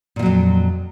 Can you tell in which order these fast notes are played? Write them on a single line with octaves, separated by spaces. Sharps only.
A#2 F3 F#3 F2